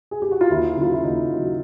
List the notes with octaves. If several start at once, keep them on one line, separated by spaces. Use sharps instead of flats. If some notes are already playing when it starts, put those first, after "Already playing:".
G#4
G4
F#4
F4
D#2 E4
C#3 F#3 F4
E4
D#2 D#4
C#3 F#3